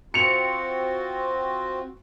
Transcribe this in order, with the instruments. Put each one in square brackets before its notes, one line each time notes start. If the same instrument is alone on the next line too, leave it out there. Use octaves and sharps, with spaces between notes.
[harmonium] C4 F4 F#4 [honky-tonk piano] C#7 F7